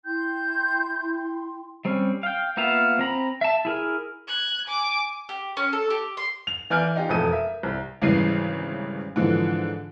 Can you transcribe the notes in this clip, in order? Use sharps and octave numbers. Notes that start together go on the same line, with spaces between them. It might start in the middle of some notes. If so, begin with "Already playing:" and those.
E4 G5 C6 G6
G3 C4 C#4
F5 G5
A#3 B3 F4 E5 F5
C4 A#5 B5
E5 A5
E4 G#4 A#4
F#6 G#6
G#5 D6
G4
C#4
A4
G4
C6
F7
E3 D5 G#5 F6 G6 D7
D#4 F4 G4
E1 F2 A3 A4 D#6 D#7
A#4 E5
C2
G#1 C#3 E3 G3 C7 D#7
G#2 D3 E3 F3